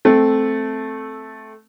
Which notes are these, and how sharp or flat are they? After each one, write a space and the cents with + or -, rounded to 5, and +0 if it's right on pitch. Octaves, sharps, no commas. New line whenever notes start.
A3 -10 C4 +0